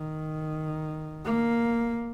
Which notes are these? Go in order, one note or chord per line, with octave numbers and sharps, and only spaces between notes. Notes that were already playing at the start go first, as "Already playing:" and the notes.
Already playing: D#3
A#3